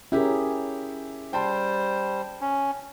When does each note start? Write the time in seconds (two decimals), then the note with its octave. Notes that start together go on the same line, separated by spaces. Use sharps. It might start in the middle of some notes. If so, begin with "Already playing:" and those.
0.12 C#4 E4 G4 G#4 A#4
1.33 G3 C5 G5 A5 C6
2.41 C#4